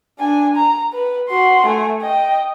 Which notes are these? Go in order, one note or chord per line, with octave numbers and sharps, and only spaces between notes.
D4 G#5
A#5
B4
F#4 C6
A3 G#5
D#5 G5